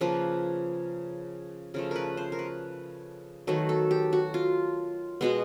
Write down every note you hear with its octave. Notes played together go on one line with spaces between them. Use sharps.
C#3 F3 A#3 B4
C#3 F3 A3 A#4
A#4 B4
C5
A#4
B4
D#3 F#3 A3 B4
A4
G4
F#4
F4
B2 G#3 B3